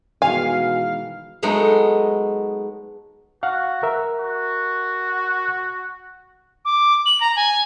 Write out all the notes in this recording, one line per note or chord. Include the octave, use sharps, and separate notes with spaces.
B2 D#3 E3 G#3 F5 G#5
F#3 G#3 A3 B3 D#4
F#4 F5 F#5
A#4 E5
F#4
D6
F#7
A#5
G#5